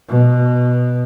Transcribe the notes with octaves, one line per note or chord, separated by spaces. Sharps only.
B2